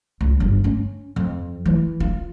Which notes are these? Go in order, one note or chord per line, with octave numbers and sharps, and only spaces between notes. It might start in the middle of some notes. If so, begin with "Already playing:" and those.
C#2
G1
C#4
F2
E3
F4